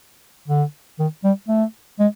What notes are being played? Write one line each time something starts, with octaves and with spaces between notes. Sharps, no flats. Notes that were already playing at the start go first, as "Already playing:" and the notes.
D3
D#3
G3
A3
G#3